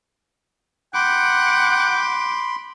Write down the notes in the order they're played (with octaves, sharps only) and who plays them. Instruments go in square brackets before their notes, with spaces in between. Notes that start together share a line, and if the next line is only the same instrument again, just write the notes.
[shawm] F#5 [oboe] G5 [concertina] B5 C6 [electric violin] D6